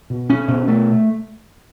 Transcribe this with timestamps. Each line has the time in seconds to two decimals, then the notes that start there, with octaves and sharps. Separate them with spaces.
0.10 B2
0.30 C#4
0.48 B2
0.68 A3